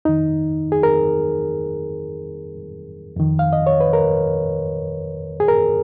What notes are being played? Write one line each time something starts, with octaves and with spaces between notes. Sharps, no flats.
F2 D#3 D#4
G#4
A#4
F2 D#3
F5
D#5
C#5
B4
A#4
G#4
A#4